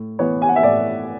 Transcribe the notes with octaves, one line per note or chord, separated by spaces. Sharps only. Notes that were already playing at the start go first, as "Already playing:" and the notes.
Already playing: A2
E3 B3 C#5
G#5
F#5
E5
A2 D5